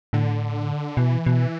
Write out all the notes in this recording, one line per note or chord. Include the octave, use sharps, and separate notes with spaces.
A2 D3
B2 E3
B2